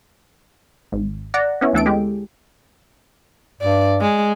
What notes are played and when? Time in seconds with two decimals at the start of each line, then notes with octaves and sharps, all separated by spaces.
0.92 G#1
1.34 D5 F#5 A#5
1.61 B3 C#4 E4
1.73 D2 E3 A4 D7
1.86 G#3 G4
3.61 G2 D5
4.01 G#3